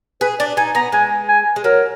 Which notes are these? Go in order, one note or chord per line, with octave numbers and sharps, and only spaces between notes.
G#4 B4
D4 D5
D#4 G#5
B3 A#5
G#3 G#5
G#5
G#3
F#3 A#4